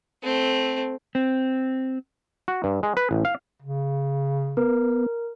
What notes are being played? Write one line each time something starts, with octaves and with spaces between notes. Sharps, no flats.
A3 C4
C4
F#4
G2
G#3
B4
A1
F5
C#3
B3 A#4